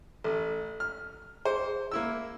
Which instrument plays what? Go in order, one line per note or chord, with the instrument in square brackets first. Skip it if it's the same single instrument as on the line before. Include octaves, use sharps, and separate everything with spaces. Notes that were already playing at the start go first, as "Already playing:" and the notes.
[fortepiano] A1 [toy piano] A4
[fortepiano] F6
[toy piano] G#4 [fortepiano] C5
[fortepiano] A#3 E4 E6